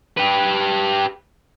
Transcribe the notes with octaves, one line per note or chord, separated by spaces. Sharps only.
G4 B4